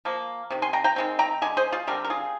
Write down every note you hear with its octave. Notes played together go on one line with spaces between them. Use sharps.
F3 A#3
C3 D#3
G#5 C6
G5 A#5
G5 A#5
D#3 G#3 C4
G5 A#5
D3 G#3 G#5
G#4 C5
F4 G#4
D3 G3 C4 G4 A#4
A#4
F4 G#4